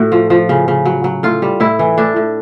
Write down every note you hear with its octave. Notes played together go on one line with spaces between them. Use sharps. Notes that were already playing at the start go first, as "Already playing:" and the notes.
Already playing: A2 F#4
F3
F3
C#3
C#3
F#3
F#3
A2 F4
G3
A2 E4
E3
A2 D4
A2